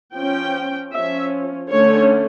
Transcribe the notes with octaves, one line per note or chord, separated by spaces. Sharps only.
F3 C#4 G5
F3 C#4 E5
D3 A3 C#4 C#5